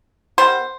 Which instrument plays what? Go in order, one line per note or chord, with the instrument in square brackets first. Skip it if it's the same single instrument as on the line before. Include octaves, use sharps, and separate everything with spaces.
[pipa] D#3 G3 B3 C5